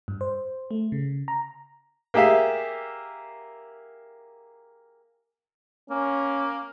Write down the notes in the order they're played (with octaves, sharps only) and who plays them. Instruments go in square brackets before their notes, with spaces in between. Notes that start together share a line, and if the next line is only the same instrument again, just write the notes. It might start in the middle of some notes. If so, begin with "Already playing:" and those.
[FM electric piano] G2
C5
A3
C#3
A#5
[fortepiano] A#3 G4 G#4 E5 F5
[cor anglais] A#3 [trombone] C#4